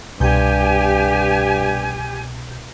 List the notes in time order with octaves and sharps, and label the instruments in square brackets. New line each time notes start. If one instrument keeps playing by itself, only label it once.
[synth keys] C2 B2 G6 [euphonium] G2 [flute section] G4 G#5